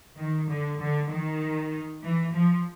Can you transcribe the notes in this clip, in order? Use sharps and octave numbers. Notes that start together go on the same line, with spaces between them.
D#3
D3
D3
D#3
E3
F3